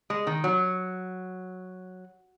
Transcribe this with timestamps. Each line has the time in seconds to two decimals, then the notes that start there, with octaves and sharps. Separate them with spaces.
0.10 G#3
0.27 D#3
0.44 F#3